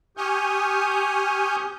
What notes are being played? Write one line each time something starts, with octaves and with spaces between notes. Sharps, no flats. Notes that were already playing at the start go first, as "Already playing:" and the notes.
G4 G#5 C#6 D#6 F6 G6